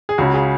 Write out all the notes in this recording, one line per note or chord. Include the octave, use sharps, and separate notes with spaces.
G#4
C#2 C#3 F#4
G#4